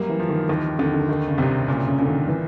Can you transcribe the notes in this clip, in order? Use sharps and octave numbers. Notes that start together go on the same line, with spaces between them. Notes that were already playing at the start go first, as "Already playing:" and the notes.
Already playing: F#2 G3 A#3
E3
F3
D#3
D#2 D#3
D#2 D3
D3
D3 D#3
C#3
C2 C3
A#2 C#3
C#3
A#2 D3
D#3
E3